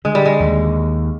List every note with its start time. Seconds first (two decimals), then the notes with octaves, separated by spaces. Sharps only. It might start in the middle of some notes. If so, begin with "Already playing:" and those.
0.05 D3 G#3
0.15 G3
0.25 G#3
0.40 D#2